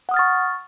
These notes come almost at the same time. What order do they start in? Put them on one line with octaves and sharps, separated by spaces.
F#5 D#6 F6 A6 C#6